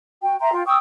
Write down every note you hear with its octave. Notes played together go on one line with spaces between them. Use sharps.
F#4 G5
E5 G5 A#5 C6
F4 G5
G5 C#6 D#6 E6